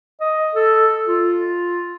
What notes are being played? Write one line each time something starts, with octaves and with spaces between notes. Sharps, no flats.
D#5
A4
F4